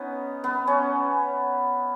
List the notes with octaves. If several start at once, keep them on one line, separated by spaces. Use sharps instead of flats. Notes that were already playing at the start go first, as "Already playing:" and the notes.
Already playing: B3 C#4 D#4
B3
C#4